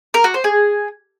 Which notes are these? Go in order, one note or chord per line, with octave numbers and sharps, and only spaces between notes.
A#4
F#4
C5
G#4